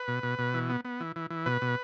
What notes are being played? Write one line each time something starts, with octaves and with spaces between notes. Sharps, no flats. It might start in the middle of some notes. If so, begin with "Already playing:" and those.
Already playing: B4
B2
B2
B2
E3
B3
B3
E3
E3
E3
B2 B4
B2